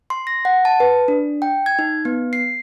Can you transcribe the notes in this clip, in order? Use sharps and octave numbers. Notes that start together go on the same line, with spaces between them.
C6
A#6
F#5
A5
B4
D4
G5
G#6
D#4
B3
C7